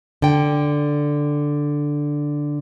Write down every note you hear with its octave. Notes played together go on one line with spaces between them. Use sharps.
D3 G5